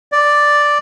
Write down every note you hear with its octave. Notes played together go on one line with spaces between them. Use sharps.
D5